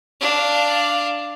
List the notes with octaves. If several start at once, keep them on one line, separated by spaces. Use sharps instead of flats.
D4 F5